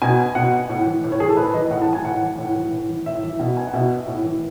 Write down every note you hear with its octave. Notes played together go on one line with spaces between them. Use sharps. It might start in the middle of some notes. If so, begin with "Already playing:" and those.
B2 G#5
B2 F#5
A2
E3
A2
C#5
E3 G#4
A4
A2 B4
E3 D#5
A2 F#5
A5
E3
G#5
A2 F#5
E3
A2
E3
A2
E3
A2 E5
E3
B2
G#5
F#5
B2 E5
A2
E3